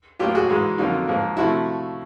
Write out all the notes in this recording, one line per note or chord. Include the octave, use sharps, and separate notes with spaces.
A2 F#3 A#3 F4 G4
F#4 G#4
G#2 E3 G#3
F2 D3 F#3 A#3 D#4 F4
G#2 F3 A#3
C3 F3 A3 E4 F#4